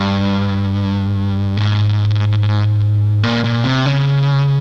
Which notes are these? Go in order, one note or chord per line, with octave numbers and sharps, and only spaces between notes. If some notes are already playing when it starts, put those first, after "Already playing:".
Already playing: G2
G#2
A#2
A#2
C3
C#3